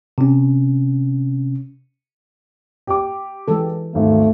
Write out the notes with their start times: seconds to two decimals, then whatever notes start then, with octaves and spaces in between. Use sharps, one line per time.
0.18 C3 C#4
2.87 G4 D6
3.48 E3 G#3 A4
3.95 G#1 D#2 A3